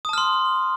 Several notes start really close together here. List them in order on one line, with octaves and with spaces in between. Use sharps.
D#6 A5 F6 C6